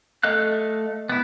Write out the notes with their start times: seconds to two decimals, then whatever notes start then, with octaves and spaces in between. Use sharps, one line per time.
0.23 A3 A4 D#5 F5 F#6
1.09 B3 E4